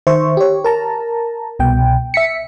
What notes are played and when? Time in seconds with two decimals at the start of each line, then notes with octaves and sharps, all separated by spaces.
0.07 D#3 C5 E5 C#6
0.37 G4 C#5
0.64 A#4 A5 A#5
1.59 C2 B2 G5
2.14 E5 B6 C#7